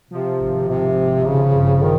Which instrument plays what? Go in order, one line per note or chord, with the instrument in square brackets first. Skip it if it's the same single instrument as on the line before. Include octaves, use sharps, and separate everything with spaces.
[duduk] C3 [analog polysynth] F3
[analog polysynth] G#1
[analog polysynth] G#1 [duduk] C3
[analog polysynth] G#1
[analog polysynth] G#1 [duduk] C#3
[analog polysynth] G2
[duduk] D#3 [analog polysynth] F3